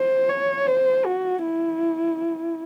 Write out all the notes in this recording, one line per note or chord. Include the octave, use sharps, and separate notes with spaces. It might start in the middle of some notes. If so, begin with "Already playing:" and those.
Already playing: C5
C#5
C5
F#4
E4